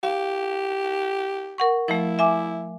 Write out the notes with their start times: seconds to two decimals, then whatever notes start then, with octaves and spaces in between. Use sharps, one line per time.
0.03 G4 F5
1.58 A#4 F#5 C#6
1.88 F3 A3 E4
2.19 E5 G#5 D6